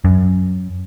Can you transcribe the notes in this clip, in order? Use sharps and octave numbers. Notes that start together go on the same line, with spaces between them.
F#2